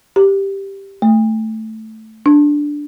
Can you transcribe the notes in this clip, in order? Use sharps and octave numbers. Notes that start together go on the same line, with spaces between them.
G4
A3
D4